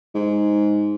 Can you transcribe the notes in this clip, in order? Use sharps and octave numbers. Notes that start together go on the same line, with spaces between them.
G#2